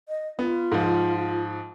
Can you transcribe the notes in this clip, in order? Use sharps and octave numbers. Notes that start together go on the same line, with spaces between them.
D#5
B3 F4
G#2 F3